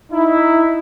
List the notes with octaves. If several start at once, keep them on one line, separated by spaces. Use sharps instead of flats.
D#4 E4